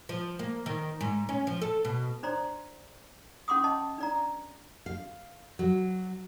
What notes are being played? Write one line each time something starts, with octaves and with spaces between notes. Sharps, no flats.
F3
A#3
D#3
G#2
C#4
F3
A4
B2
D4 C5 D5 A#5 C6
C#4 F#5 C6 D6 D#6
D#5 A5
D4 D5 A#5
F5
F#3